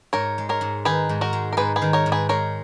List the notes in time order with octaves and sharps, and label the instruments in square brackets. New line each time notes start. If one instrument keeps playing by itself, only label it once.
[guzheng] G#2 [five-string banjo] A#4 C#5
[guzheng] G#3
[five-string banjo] A#4 C#5
[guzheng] G#2
[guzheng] D#3 [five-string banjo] G#4 B4
[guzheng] G#2
[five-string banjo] F#4 A#4
[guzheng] G#3
[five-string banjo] A#4
[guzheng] G#2 [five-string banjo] G#4 B4
[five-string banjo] G#4 B4
[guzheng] D#3
[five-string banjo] A#4 C#5
[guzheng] G#2
[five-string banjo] G#4 B4
[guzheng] G#3 [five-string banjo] A#4 C#5